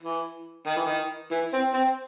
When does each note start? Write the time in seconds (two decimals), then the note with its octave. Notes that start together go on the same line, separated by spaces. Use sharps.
0.02 E3
0.67 D#3
0.76 E3
0.86 D#3
1.31 E3
1.53 C4
1.74 C4